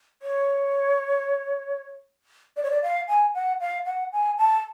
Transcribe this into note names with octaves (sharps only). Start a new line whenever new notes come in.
C#5
D5
C#5
D5
F5
G#5
F#5
F5
F#5
G#5
A5